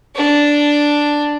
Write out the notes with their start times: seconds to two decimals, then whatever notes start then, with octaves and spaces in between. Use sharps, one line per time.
0.16 D4